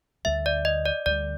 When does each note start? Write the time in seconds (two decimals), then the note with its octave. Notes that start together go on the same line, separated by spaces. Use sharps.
0.25 D2 D3 G3 E5
0.46 D5
0.65 D#5
0.85 D5
1.06 D2 D3 G3 D5